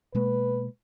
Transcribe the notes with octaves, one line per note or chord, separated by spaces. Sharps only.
B2 G#3 A#3 B4